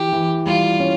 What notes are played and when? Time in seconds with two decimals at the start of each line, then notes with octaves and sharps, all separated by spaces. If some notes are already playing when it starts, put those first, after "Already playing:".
Already playing: E3 G4
0.13 E3
0.46 G3 F4
0.80 C#4